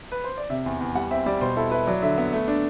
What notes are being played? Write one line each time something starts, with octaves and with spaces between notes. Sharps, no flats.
B4
C5
D5
C3 E5
E2
E2
G3 F#5
C4 E5
G3 D5
B2 C5
E4 A4
E4 B4
F#3 D5
D3 E5
B3 E5
A3
D4